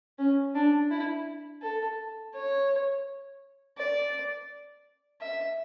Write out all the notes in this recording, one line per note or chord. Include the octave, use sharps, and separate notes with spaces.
C#4
D4
E4
A4
C#5
D5
E5